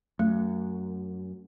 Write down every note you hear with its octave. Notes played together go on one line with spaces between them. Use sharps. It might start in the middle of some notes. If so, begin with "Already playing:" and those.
F#2 A3